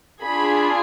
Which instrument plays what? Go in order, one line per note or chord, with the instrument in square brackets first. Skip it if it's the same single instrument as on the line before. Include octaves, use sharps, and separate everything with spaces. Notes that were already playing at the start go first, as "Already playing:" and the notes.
[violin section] D4 F4 G#4 B5